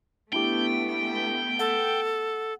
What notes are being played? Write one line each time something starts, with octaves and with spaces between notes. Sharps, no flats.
A3 B3 D4 E4 G4 G5
A4 F#5